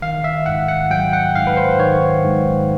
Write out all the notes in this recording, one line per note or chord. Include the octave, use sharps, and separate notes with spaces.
D#3 F5
E5
G#2 F#5
F#5
F#3 G5
F#5
G#2 F5
B4
C5
D#3 C#5
G#2